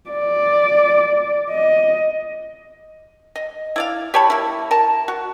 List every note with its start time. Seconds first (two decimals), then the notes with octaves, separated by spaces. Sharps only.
0.10 D5
1.50 D#5
3.36 D#5
3.76 E4 D5 F5
4.14 G4 C#5 A5 B5
4.30 A#3 E4
4.71 A#4 A5
5.08 F#4